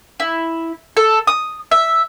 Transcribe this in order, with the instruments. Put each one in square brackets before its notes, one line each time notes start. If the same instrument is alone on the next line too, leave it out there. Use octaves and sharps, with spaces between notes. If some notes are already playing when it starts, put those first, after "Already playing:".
[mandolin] E4
A4
D#6
E5